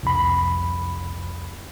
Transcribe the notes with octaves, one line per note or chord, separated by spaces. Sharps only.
C2 F2 B5